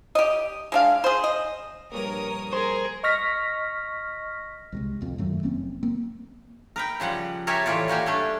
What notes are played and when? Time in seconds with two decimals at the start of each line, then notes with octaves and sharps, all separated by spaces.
0.15 G4 D#5
0.72 G#3 D4 F5
1.04 G#4 C5
1.24 D#5
1.92 A#1 G2 A#4 C#5 A#5 D#6
2.53 G#4 A#4 C5
3.03 D#5 C#6 F6 A#6 B6
4.72 C2 C3 G#3
5.01 B1 F2 B2
5.18 F#2 D#3 F#3 A3
5.43 F1 A#3 C4 C#4
5.83 A#3 C4
6.76 A#4 B4 G5
7.00 C#3 F3 G3 F#5
7.47 G4 A#4 C#5 E5 G#5 A5
7.66 A2 E3 F4 C#5 D5
7.88 A#3 F#4 G4 G#5
8.06 G3 A3 D4